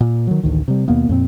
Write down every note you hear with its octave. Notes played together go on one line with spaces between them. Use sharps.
A#2
D#3 F#3
A1 D2 D#3
C3 G3
D#2 B2 A#3 B3
F2 A#2 C4